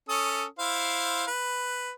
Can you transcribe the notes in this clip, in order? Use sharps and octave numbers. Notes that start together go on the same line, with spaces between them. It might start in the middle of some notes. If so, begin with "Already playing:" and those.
C#4 A4 D#6
E4 C5 F5
B4